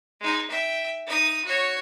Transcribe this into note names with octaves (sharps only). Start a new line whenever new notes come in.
G#3 D#4
E5 G5
D#4 D#6
F#4 C#5